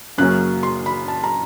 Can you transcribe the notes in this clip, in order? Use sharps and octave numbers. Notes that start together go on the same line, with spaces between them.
F#2 C#3 F#3 A#3 C#4 F#6
C6
B5
A5
A#5